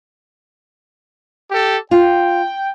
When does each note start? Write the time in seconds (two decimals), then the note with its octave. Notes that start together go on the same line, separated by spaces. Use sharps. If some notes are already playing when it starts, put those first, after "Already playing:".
1.51 G4 A4
1.91 F4 G5